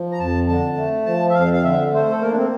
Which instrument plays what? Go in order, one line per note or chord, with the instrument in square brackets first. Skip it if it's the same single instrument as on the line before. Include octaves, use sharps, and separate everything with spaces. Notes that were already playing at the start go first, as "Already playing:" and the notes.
Already playing: [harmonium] F3
A#5
F2 A5
D3 A5
A3
F3 A5
E5
F2 F5
F5
D3 E5
A3 C5
A4
A#3 A#4
D4
C4